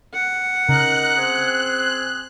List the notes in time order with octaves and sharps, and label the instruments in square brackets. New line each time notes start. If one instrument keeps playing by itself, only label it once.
[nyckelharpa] F#5
[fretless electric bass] C#3 [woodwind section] D#4 A#4 [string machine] F#6
[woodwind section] C4 G#4